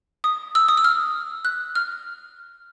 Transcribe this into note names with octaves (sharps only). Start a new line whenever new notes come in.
D#6
E6
D#6
E6
F6
F#6
F6